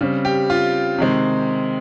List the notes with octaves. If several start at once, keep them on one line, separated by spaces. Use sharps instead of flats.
C#3 G3 C4
G4
F4
C3 D#3 G#3 C4